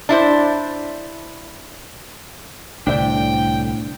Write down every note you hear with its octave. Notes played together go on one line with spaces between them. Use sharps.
D4 E4 C5
C2 A2 D3 D4 C5 E5 G5